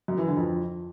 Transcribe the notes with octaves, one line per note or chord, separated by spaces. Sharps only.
F#2
E3
D3
F2